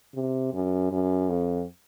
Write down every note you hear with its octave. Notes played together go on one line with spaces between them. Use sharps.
C3
F#2
F#2
F2